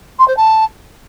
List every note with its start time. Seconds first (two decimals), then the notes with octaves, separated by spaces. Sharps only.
0.19 C6
0.28 C5
0.37 A5